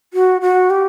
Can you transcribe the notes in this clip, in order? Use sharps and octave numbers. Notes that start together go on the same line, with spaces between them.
F#4
F#4
G4